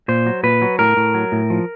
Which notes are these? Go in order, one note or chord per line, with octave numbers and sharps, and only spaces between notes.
A#2 C5
F#3
A#2 B4
F#3
A2 A#4
A2
F#3
A2
F3